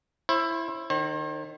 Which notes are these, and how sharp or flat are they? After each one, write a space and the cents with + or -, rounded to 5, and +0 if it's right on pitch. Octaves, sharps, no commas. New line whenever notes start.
E4 +10 C5 +40
D#3 -25 C5 +45